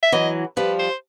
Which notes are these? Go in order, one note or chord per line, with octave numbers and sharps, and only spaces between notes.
E5
E3 F#3 D#5
F3 G3 B4
C5